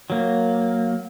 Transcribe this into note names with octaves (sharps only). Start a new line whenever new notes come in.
F#3 A#3